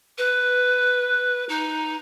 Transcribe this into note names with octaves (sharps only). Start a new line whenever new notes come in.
B4
D#4